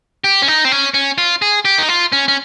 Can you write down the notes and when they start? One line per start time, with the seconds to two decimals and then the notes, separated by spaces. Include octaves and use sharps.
0.24 G4
0.42 C#4
0.48 D#4
0.65 C4
0.72 C#4
0.94 C#4
1.18 F4
1.42 G#4
1.65 G4
1.78 D#4
1.89 F4
2.12 C#4
2.28 C#4